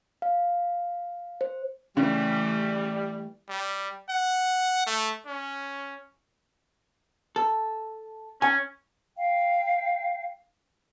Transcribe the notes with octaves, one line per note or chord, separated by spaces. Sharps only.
F5
C5
C#3 E3 G3 A3
G3
F#5
A3
C#4
A4
C#4 G#5
F5 G5